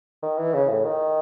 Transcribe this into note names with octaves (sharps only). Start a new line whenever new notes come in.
D#3
E3
C#3
A2
D#3